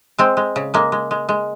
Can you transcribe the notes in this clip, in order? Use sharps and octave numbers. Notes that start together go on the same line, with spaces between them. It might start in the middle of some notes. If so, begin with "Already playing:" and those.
G#3 C4
G#3
C#3
G#3 A#3
G#3
G#3
G#3